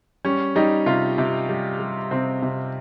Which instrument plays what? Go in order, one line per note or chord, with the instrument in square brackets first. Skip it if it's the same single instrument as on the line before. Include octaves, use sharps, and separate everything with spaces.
[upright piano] G3 C#4
G3 D#4
C3 F4
C3
G3
G3
C3 C4
C3